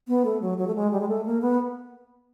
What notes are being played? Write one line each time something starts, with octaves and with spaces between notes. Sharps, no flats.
B3
A3
F#3
F#3
A3
G#3
G3
G#3
A3
A#3
B3